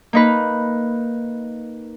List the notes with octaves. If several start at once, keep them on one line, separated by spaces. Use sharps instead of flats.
A#3 D#4 B4